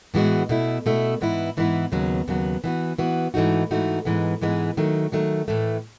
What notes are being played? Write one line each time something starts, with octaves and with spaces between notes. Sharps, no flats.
A2 E3 G#3 B3 F#4
B2 A3 E4
B2 A3 E4
G#2 E3 B3 E4
G#2 E3 B3 E4
D#2 C#3 F#3 B3
D#2 C#3 F#3 B3
E3 B3 F#4
E3 B3 F#4
G#2 E3 A3 D#4 F#4
G#2 E3 A3 D#4 F#4
G#2 E3 G#3 B3
G#2 E3 G#3 B3
D#3 F#3 A3
D#3 F#3 A3
A2 E3 A3